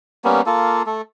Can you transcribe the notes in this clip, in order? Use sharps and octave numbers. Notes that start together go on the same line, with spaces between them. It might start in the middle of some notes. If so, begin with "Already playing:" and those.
G3 A#3 B3 C#4
A#3 F4 A4
A3 A4